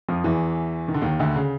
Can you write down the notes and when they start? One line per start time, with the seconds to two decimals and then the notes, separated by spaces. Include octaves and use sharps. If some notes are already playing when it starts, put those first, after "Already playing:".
0.09 F2 F3
0.24 E2 E3
0.88 D#3
0.94 D3
1.02 D#2 D#3
1.20 D2 D3
1.35 C#3